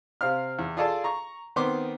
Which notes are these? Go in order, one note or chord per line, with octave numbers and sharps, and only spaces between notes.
C3 C4 F5 F6
E2
F4 G#4 A4 D5 A5
A#5 C#6
D#3 B3 C4 C6 D6